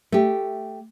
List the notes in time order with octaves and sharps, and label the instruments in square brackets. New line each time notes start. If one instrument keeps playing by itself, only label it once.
[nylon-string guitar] A3 G4